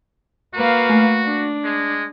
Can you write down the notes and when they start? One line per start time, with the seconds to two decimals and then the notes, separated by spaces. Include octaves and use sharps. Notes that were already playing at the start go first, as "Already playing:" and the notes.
0.55 A#3 F#4 B4 F5
0.90 A3
1.25 D4
1.64 G#3